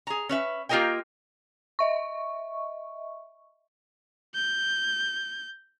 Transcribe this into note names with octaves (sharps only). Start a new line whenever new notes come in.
G#4 A#5
C#4 B4 E5
A#3 F4 G4 A#4 D#5 G5
D#5 E5 C#6
G6